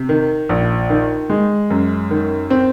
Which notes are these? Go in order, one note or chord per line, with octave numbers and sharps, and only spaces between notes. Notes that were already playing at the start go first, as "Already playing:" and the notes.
Already playing: C3
D#3
A#1
D#3
G#3
F#2
D#3
C4